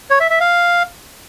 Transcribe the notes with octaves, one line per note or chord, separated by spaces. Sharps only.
C#5
E5
E5
F5